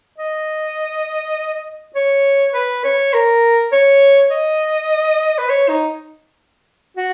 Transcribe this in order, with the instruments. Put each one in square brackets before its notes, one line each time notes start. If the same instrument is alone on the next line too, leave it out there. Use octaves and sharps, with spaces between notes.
[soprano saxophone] D#5
C#5
B4
C#5
A#4
C#5
D#5
B4
C#5
D#4
F#4